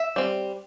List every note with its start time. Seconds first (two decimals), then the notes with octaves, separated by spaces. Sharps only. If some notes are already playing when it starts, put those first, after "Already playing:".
Already playing: E5
0.16 G3 C4